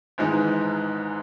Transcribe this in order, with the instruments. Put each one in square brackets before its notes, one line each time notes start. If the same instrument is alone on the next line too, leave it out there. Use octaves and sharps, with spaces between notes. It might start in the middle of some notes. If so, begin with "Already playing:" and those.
[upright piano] G#1 G#2 E3 G#3 D#4